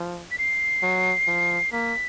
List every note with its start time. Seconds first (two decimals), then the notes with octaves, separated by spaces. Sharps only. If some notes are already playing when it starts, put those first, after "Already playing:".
Already playing: F3
0.31 B6
0.39 C7
0.83 F#3
1.27 F3
1.72 A#3 B6